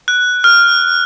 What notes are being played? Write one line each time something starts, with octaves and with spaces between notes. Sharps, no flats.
F#6
F6